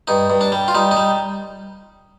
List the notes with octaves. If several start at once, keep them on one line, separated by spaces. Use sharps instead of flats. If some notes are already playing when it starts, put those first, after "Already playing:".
G2 D#4
G2
D4
G3
F4
G3 D#4
D#4
G3